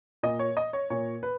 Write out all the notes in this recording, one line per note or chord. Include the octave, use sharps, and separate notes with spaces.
A#2 D#5
C#5
D#5
C#5
A#2 C#5
B4